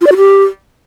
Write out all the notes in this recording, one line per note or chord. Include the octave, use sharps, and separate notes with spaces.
F4
D5
F#4
G4